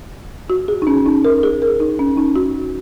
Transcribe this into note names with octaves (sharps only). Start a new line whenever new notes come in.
F#4
G#4
D#4
C#4
D#4
A#4
G#4
A#4
D#4
C#4
D#4
F#4